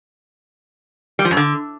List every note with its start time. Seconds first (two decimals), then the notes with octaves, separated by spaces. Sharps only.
1.19 G3
1.25 F3
1.31 F#2
1.37 D3